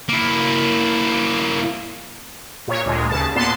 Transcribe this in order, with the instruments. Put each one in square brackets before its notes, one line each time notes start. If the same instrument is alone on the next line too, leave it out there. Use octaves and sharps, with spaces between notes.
[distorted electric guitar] A#3 E4
[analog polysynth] A#2 C#5
D2 A#2 G#3
D#2 C#3 A5
A#2 B3 A5 C6